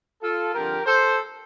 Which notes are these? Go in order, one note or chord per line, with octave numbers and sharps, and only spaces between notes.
F4 A4
G2 D3 F3 C4 G4 A#4
A4 C5